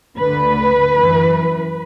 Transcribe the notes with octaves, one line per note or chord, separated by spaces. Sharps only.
D2 D3 B4
F#2 E3